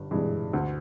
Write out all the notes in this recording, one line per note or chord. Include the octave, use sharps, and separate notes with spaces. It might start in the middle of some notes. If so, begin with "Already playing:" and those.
Already playing: G1 G2
G2 E3 G#3
D2